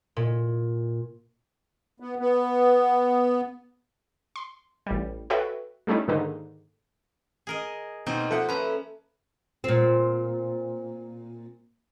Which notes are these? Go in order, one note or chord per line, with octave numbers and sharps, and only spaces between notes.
A#2
B3
B3
C6
A1 G3
F#4 A4 B4 C#5 E5 G5
G3 A3 C#4 D#4 E4
G#2 D3 D#3 A#3 D4 D#4
G#4 A#4 D#5
B2 A#3 C4 D#4 F4 C5
F3 A4 E5 F#5
F3 C#4 B4 A#5
A#2 C4